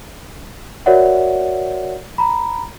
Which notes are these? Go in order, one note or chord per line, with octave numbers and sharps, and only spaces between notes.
F#4 A#4 C#5 D5 E5 F#5
A#5 B5